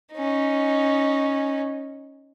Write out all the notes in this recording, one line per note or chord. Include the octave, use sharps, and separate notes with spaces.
C#4 D#4